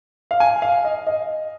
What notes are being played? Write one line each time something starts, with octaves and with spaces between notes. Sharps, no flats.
F5
G#5
F5
D#5
D#5